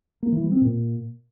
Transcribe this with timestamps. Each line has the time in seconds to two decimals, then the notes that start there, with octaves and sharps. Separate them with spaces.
0.23 A#3
0.32 E3
0.42 G3
0.52 C4
0.61 A#2